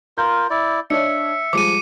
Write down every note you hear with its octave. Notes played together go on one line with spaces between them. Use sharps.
F4 A#4 G6
E4 D5
D4 C#5 D#5 E5 C#7
F3 G3 G#3 D6 C#7 D#7